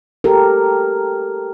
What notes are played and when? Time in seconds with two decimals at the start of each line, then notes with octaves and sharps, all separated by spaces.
0.24 G4 A4 A#4